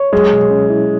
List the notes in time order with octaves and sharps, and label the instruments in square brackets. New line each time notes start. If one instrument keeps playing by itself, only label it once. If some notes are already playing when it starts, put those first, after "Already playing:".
Already playing: [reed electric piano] C#5
[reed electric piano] F#3 [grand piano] G#3
[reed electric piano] B2
C#4
E4